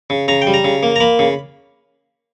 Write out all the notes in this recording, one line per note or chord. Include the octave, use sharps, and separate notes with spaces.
C#3
C#3 A#5
G5
G3
A#5
C#3
A#3
A#5
A#3 B5
C#3